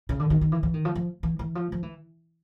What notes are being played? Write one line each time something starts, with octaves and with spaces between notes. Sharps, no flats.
C#3
D3
D#3
D#3
E3
E3
D#3
F3
F3
E3
E3
F3
F3
E3